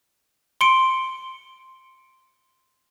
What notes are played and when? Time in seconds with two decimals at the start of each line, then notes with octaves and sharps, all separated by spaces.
0.61 C6 C#7 D7